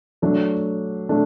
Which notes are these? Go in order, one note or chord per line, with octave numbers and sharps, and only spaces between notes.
F#3 A3 D4
A3 D4